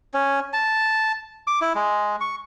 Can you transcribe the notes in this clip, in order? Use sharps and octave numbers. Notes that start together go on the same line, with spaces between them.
C#4
A5
D6
E4
G#3
C#6